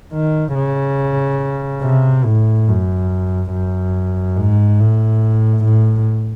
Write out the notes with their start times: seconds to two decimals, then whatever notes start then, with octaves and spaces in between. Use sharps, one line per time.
0.13 D#3
0.55 C#3
1.82 C3
2.25 A2
2.68 F#2
3.51 F#2
4.37 G#2
4.80 A2
5.64 A2